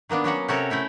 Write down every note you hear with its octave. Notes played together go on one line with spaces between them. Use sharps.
D#3 A#3 B3 D4
F#3 C#4 F#4 F#5
C3 C#4 F#4 A4 A#4 C#5
A3 C#4 E4 G5